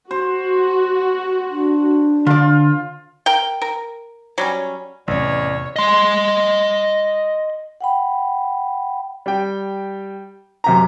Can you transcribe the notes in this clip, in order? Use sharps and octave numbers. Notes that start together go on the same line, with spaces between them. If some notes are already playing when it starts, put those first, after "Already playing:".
F#4 C5
D4
D3 F4 D5
A#4 G5
A#4
F#3 G3 C#4
A1 E2 C3 C#5 D5
D#5 C6
F#5 G5 B5
G3 G5
F#2 C3 A#5